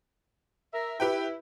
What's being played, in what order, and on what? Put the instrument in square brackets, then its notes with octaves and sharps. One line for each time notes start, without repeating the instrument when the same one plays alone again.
[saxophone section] A#4 E5
[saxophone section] E4 [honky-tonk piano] G4 B4 G5